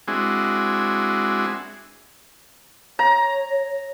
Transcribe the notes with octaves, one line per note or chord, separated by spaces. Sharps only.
G#3 C4 D4 E4 F#4 G#4
C#5 A#5